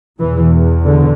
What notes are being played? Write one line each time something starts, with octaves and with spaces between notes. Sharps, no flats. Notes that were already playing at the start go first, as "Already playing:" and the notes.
E2 B2 E3
D3